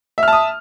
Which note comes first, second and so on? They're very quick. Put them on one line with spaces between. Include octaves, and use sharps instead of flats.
E5 F6 A5 D#6